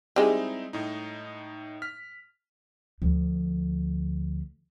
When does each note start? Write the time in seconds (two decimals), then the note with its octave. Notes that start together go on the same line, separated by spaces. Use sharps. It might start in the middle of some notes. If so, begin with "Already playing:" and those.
0.16 G3 G#3 C4 D#4 E4
0.73 A2 D#4
1.82 F6 B6
3.02 D2 F3